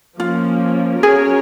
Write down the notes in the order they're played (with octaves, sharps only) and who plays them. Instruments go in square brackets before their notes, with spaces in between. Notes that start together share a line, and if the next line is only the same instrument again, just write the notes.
[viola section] F3 A#3 C#4 [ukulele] F4
[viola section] C#4 F#4 A#4 C#5 [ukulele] G#4